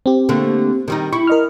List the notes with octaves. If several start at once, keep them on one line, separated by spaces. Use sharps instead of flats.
C4 G4
D3 A3 A#3
D#3 G3 D#4
E4 C#6
A#4 D#5 F6